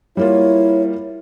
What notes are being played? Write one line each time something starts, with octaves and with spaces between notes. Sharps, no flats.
G3 A#3 E4 F4 C#5